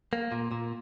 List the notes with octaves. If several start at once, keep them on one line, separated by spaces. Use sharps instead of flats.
A#3
A#2
A#2